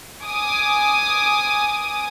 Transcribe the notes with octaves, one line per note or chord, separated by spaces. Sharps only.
G#5 D6 D#6